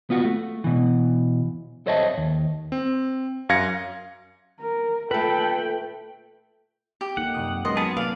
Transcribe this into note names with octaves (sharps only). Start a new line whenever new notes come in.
B3 F4 F#4
A3
B2 E3
A4 C5 C#5 D#5 E5 A5
D#2
C4
F#2 F5 G#6 A#6 C#7
A#4
A#2 A3 A4 B4 G5
G4
A#3 D#4 A4 F#5
F#2 C3 D#6
F#3 G#3 C#4 A#4 B4 D#5 C6
B3 G#4 A5
C3 A#3 B4 D5 F5 A6